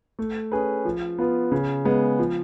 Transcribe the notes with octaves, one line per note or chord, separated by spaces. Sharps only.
A3
C#4 G#4 B4
F3
B3 F4 B4
C#3
G#3 B3
F3